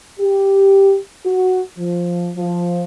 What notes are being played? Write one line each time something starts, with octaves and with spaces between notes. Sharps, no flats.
G4
F#4
F3
F3